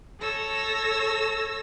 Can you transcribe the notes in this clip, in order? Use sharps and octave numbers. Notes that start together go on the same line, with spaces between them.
A4 C#5 E6 A#6